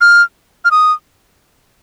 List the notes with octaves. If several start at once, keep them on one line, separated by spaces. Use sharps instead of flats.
F6
F6
D#6